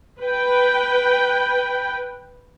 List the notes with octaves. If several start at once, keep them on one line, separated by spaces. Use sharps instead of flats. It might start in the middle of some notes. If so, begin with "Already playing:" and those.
B4 G5